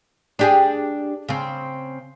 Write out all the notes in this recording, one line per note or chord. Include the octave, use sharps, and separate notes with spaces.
D4 G4 G#4
C#3 C4